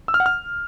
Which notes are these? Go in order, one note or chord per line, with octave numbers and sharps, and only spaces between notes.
E6
F6
F#5
F6